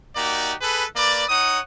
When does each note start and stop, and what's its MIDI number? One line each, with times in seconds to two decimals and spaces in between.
0.16 0.54 58
0.16 0.54 63
0.16 0.54 66
0.16 0.54 67
0.16 0.54 74
0.61 0.85 68
0.61 0.85 69
0.61 0.85 71
0.96 1.24 58
0.96 1.24 71
0.96 1.24 74
1.28 1.59 63
1.28 1.59 73
1.28 1.59 78
1.28 1.59 87